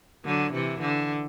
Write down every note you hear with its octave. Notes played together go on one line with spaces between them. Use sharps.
D3 F#3
C3 E3
D3